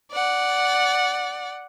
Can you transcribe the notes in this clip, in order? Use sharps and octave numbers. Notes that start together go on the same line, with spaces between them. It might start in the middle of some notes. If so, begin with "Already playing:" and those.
D5 F#5